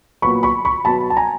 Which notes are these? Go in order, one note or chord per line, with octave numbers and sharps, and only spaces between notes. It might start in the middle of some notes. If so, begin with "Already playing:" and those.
A#2 F#3 B3 B5 C#6
B5 C#6
B5 C#6
B2 F#3 B3 A5 B5
A5
G#5 A#5